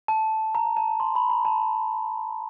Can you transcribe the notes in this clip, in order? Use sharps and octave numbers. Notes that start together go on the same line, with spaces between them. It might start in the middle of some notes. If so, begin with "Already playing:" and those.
A5
A#5
A5
C6
B5
A#5
A5